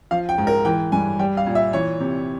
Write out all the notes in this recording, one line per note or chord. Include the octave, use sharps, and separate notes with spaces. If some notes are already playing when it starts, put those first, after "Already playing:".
F3 F5
G5
G#2
A#4
E3 G5
G2 G#5
G3 G5
F5
A#2
E5
E3 C#5
C3